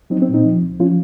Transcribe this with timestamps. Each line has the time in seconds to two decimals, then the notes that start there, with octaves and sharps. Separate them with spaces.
0.10 F#3 C4 D#4
0.22 C4
0.29 A#2
0.34 C4 D#4
0.45 F3
0.62 C#2
0.79 F3 C#4 F4